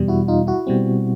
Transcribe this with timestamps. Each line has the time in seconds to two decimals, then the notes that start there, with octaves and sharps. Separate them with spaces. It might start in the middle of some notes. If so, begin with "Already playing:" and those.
Already playing: E2 B2 G3
0.08 E4 F#4
0.28 D#4 F4
0.47 E4 F#4
0.67 B2 G3 C4